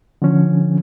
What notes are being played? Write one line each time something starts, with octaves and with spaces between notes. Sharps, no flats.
D3 F3 C#4